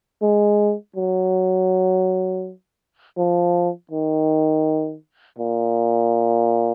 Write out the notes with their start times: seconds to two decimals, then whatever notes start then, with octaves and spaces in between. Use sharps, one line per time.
0.22 G#3
0.96 F#3
3.18 F3
3.91 D#3
5.39 A#2